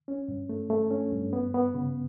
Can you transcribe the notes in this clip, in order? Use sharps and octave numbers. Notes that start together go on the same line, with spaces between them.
C#4
G2
A3
A3
C#4
G2
B3
B3
C#3